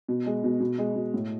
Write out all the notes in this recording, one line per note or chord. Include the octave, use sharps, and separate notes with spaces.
B2
G#3
B2
B2
G#3
B2
A2